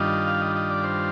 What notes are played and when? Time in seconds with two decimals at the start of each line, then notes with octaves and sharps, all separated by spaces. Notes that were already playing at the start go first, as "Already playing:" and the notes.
Already playing: G2 D#3 G3 D4 F4 D#5
0.27 F5
0.41 D#5
0.56 D#5
0.70 D5
0.84 C5